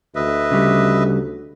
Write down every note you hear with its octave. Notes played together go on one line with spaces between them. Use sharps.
D2 B4 D#5 E5
C#3 G3